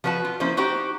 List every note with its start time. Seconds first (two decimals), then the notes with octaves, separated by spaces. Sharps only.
0.04 F3 F#4 B4 D5 A5
0.25 F4
0.40 F3 A#3 C#4 E4 C5
0.57 D#4 F#4 G4 C5 G5